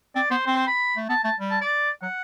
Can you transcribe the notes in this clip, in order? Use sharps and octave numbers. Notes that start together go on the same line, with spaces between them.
C4 D5
B3 C5
C4 C5
C5
B5
A3
B3 A5
A3 A5
G3
A5
D5
F#3 F#5